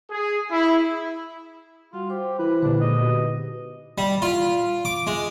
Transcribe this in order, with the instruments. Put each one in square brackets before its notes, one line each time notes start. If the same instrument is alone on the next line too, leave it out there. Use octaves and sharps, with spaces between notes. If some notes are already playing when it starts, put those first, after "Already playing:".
[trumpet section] G#4
E4
[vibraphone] G3 F#4 F#5 [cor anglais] F4
[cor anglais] G4 [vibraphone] C5
[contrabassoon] E3 [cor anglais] B4
[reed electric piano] A#2 D3 [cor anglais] D4 [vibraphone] G4 B4
[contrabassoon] G#2 [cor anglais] D#5
[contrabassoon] B2
[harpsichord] G3
F4
D6
G#3